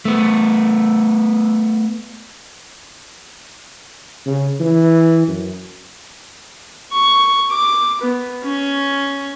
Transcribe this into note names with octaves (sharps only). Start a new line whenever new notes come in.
A3 B3
C#3
E3
F#2
C#6
D6
B3
C#4